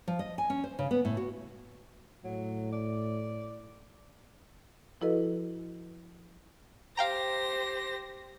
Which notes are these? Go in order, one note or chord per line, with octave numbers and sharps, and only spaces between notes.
F3
D#5
G#5
C#4
C5
C#3
B3
A2
F#4
A2 F#3
D5
F3 E4 F#4 A4 B4 D#5
G4 C5 F5 G5 A#5 A#6